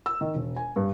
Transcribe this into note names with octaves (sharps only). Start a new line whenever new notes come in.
E6
D#3
E1
G#5
G2